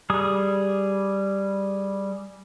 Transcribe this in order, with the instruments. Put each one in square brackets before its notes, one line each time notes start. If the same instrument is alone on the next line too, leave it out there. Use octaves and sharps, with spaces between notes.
[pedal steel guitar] G3 G#4 D#6